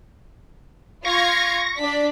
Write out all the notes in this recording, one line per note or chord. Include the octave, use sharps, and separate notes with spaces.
F4 F5 C#6 G#6 A#6
D4 D5 B6